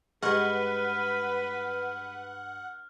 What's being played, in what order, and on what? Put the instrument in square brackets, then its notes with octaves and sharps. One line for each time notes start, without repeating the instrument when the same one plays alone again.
[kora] G2 G#3 [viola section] B4 [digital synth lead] F#5 [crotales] F6 F#6